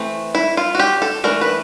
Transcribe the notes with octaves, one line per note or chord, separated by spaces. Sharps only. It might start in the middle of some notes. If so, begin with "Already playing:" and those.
Already playing: E3 A3 C4
E4
F4
F#4
G4
A4
E3 A3 D4 A#4
B4